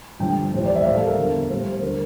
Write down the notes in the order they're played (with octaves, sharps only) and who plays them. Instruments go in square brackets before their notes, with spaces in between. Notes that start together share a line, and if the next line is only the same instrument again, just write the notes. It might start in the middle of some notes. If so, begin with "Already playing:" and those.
[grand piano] G2 D3 F3 G5
A2 E3 G3 C5
D5
E5
A2 G3 F5
A4
A#4
E2 D3 F3
A2 G3 C5
D3 G3 A#4